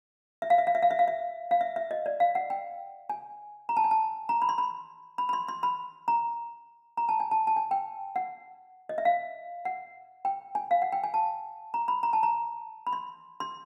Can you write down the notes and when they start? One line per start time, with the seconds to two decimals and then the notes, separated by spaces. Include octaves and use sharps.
0.42 E5
0.50 F5
0.58 E5
0.67 F5
0.75 E5
0.82 F5
0.91 E5
0.99 F5
1.08 E5
1.51 F5
1.61 E5
1.76 E5
1.91 D#5
2.06 D5
2.20 F5
2.35 F#5
2.50 G5
3.10 G#5
3.69 A#5
3.77 A5
3.84 G#5
3.91 A5
4.29 A#5
4.42 B5
4.49 C6
4.58 B5
5.18 B5
5.29 B5
5.33 C6
5.48 C6
5.63 B5
6.08 A#5
6.97 A#5
7.09 A5
7.20 G#5
7.31 A5
7.47 A5
7.56 G#5
7.71 G5
8.16 F#5
8.89 D#5
8.98 E5
9.05 F5
9.65 F#5
10.25 G5
10.55 G#5
10.71 F5
10.82 F#5
10.92 G5
11.04 G#5
11.14 A5
11.74 A#5
11.88 B5
12.03 A#5
12.13 A5
12.23 A#5
12.87 B5
12.93 C6
13.40 C6